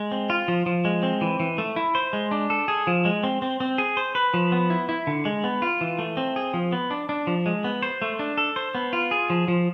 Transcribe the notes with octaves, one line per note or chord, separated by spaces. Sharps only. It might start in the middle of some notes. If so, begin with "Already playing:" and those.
Already playing: G#3
C4
F4
F3
F3
G#3
C4
E3
E3
A3
E4
C5
G#3
D4
A4
G#4
F3
G#3
C4
C4
C4
G#4
C5
B4
F3
B3
E4
E4
D3
G#3
B3
F4
E3
A3
C4
G#4
F3
B3
D4
D4
F3
G#3
B3
C5
A3
D4
A4
C5
B3
F4
G#4
F3
F3